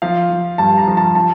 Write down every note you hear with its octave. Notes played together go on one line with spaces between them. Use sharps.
F3 F5
F3
G2 A5
A#5
F3
A5
F3 A5